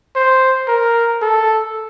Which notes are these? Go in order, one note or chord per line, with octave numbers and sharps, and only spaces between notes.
C5
A#4
A4